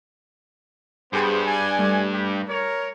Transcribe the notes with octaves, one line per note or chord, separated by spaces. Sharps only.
G2 B3 G4 G#4 C5
D5 G#5
G3 A3
G4
A#4 C#5